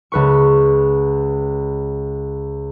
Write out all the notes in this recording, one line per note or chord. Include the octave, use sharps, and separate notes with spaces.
C#2 B4 C#6